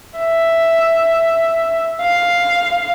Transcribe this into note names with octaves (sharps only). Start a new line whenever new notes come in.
E5
F5